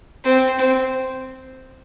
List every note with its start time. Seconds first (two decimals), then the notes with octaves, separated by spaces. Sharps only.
0.24 C4
0.58 C4